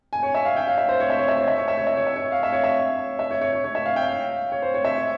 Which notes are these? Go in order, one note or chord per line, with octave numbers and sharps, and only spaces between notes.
G#5
C#5
E5
F5
G5
F5
E5
C5
C#5
E5
C#5
E5
C#5
E5
C#5
E5
C#5
E5
C#5
E5
C#5
F5
E5
C#5
E5
E5
C#5
C#5
C#5
C#5
E5
F5
G5
F5
C#5
C5
C#5
E5
C#5